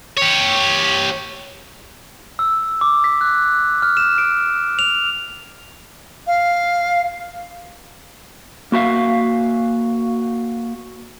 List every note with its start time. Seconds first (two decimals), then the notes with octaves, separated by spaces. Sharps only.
0.17 G4 C#5
2.39 E6
2.81 D6
3.04 B6
3.21 F#6
3.82 F6
3.97 E7
4.18 D7
4.79 F7
6.27 F5
8.72 A#3 F#4 E5 F5